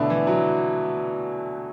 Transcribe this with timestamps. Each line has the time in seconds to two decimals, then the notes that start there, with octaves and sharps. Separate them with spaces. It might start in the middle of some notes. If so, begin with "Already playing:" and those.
Already playing: B2 D3 A3 E4 D5
0.10 E3
0.27 F#3